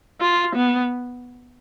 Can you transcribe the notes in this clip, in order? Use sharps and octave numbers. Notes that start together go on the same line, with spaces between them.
F4
B3